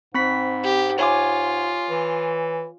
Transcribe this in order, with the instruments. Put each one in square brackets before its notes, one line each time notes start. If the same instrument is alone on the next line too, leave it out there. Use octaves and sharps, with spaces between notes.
[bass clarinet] G#2 [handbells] C4 B5 B6
[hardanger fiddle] G4
[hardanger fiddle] F4 [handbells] C#5 G#5 D6
[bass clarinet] E3